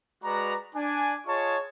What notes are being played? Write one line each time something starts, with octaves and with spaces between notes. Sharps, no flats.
G#3 F#4 B4 D5 A#5
D4 G#5
F4 G#4 C#5 D#5 A5 C#6